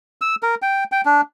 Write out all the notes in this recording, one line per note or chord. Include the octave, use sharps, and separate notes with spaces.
E6
A#4
G5
G5
D4